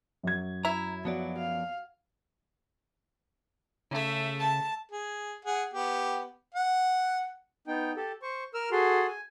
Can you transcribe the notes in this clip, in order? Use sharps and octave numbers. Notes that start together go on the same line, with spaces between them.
F#2 F#4 G#6
E4 A#5
F3 F#3 B3 D5
F5
C#3 A3 E5
A5
G#4
G#4 F#5
B3 G4
F#5
B3 D#4 G5
G4 A4
C5 C#6
A#4 E6 F6
F#4 G#4 A4 C6
G#5